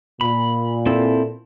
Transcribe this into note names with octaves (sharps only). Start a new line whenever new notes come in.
A#2 B5
C4 E4 A4